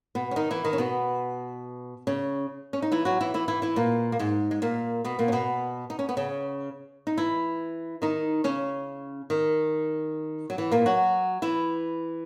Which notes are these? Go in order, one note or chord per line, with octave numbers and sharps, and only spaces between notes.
B2 B3
C#4
D#3 D#4
E3 E4
D#3 D#4
C#4
B2 B3
C#3 C#4
C#4
D#4
E3 E4
F#3 F#4
E3 E4
E3 E4
E3 E4
E3 E4
A#2 A#3
A#3
G#2 G#3
G#3
A#2 A#3
B2 B3
A#2 A#3
C#4
B2 B3
D#4
C#4
B3
C#3 C#4
D#4
E3 E4
D#3 D#4
C#3 C#4
D#3
F#3
E3
A#2 A#3
F#3 F#4
E3 E4